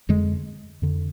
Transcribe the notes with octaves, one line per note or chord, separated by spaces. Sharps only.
F2 D3 G#3
F2 D3